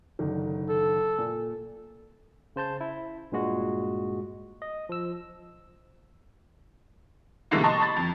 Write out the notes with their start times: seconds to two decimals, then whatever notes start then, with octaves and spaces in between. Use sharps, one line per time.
0.19 F#1 D3 D#3
0.69 A4
1.18 A#2
2.56 C#3 C5 A5 G6
2.81 E4
3.32 G2 A#2 G#3 F#4
4.62 D#5
4.89 F3 E6
7.51 B2 D3 E3 G3 G#3 A#3
7.64 D#5 A5 A#5 C6 C#6
7.81 B5 A6
7.96 F2